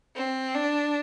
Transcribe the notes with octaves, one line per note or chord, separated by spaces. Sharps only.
C4
D4